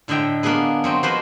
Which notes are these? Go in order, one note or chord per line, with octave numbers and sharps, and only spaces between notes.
A2 D3 D#5 E5 G5 A#5
A#3 B3 D4 G#4 B4
F#3 C4 D#5 G5
F3 A#3 F#4 B4 C5 D#5